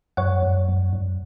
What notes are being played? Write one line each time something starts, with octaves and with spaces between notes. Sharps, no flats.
F#2 C#5 F#5
F#2
F#2
F#2